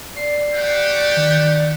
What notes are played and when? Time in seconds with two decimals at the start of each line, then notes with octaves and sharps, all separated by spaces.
0.16 D5 C7
0.54 A3 G4 F#5
1.17 D#3